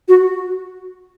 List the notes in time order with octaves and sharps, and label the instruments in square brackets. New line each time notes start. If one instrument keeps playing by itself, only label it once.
[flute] F#4